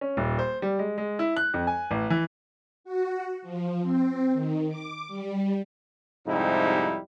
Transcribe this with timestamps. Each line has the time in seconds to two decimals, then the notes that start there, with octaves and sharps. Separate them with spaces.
0.01 C#4
0.17 D#1
0.39 C5
0.62 G3
0.79 G#3
0.98 G#3
1.19 E4
1.37 F#6
1.54 F2
1.67 G#5
1.91 A1
2.10 E3
2.84 F#4
3.42 F3
3.82 C4
4.33 D#3
4.68 D6
5.08 G3
6.27 F2 G#2 C3 G3 D#4 E4